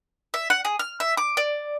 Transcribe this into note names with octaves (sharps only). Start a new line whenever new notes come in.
E5
F#5
G#4
F6
E5
D6
D5